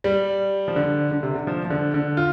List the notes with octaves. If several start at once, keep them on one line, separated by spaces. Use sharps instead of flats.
G3
F3
D3
D3
C3
D3
F3
F3
D3
D3
F4